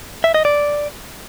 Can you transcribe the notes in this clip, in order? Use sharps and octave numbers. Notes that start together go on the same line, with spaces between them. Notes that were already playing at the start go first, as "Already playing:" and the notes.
E5
D#5
D5